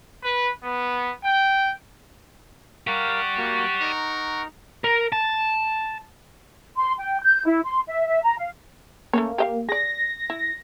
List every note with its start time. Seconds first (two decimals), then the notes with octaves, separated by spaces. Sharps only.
0.24 B4
0.63 B3
1.24 G5
2.87 G4 A#4 D5 F5 F#5 C#6
3.37 A#3 F#4
3.81 D#4 A#4 A#5
4.84 A#4
5.12 A5
6.77 C6
6.99 G5
7.22 G6
7.45 E4
7.64 C6
7.88 E5
8.07 E5
8.23 A#5
8.37 F5
9.13 A3 A#3 C#4 C#5
9.38 G4 D#5 F5
9.69 G#4 D5 A#6
10.30 E4